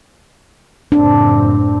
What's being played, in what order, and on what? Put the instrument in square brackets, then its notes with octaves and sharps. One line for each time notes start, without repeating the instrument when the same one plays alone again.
[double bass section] F#1 A2 C4 [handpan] D4